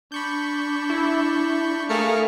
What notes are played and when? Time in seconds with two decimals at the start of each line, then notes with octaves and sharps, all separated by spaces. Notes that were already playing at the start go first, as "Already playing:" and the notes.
0.12 D4 B5 C#6 G6
0.90 E4
1.89 A3 G#4 A#4 F5 C#7